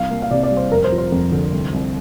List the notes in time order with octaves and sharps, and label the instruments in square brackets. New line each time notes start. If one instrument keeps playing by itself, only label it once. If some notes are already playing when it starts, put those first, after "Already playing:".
Already playing: [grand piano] C2 F5
A#3
F5
C3 D5
D5
G3
C5
F1 A#4
C5
F3
C5
F2
D3
C2
C2